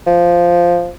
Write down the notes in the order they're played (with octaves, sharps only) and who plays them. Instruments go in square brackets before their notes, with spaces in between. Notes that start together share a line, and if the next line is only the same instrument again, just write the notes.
[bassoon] F3